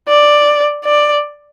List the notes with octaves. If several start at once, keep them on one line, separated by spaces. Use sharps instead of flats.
D5
D5